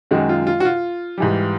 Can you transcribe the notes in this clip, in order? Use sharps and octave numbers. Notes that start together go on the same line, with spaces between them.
F#2 D#3 G#3 F#4
F4
F4
F#4
F4
G#2 E3 G3